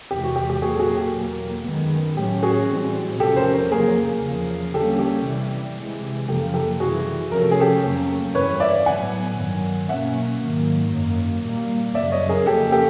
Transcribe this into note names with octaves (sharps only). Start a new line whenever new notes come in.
E2 C3 E3 G#3 G4
F#4
G4
G4
A#2 F#3 A#3 F#4 G#4
A4
F#4 G#4
G4 A4
E2 B2 F#3 A#3
F#2 D#3 G#3 B3
A2 F#3 A3 C#4 G4
F#4 G#4
A2 E3 G3 C4
E2 C3 F3 A3 C#4 G4 A4
A#4 C5
A#4 C5
F2 C#3 F#3 A#3 G#4 A#4
E2 C#3 F3
D3 G3 A#3 C#4 G4 A4
G4
C3 E3 G3
C3 E3 G#3
F#2 C#3 F3 A#3 G4 A4
G4 A4
C3 E3 G3 F#4 G#4
C3 F3 A3 C#4 A#4
A4
G#4
G4 A4
F2 C#3 F#3 A#3 C#4
G2 E3 G3 B4 C#5
D5 E5
A2 F#3 B3 F#5 G#5
G2 D#3 F#3
B2 F#3 A#3 C#4 E5 F#5
G#2 D#3 F#3 A#3
F#2 D#3 F#3 A#3
A#2 G3 A#3
F#2 C#3 F#3 D5 E5
C#5 D#5
G#4 A#4
F2 C#3 F3 A#3 C#4 G4 A4
G4 A4